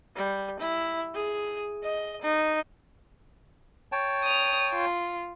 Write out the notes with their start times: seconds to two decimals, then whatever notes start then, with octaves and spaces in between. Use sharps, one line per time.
0.16 G3
0.60 E4
1.14 G#4
1.83 D#5
2.22 D#4
3.92 C#5 G5 A5
4.24 D#6 F7
4.73 F4